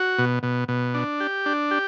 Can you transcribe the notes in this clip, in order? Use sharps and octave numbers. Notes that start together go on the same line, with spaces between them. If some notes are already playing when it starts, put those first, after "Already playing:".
Already playing: F#4
B2
B2
B2
D4
G4
D4
G4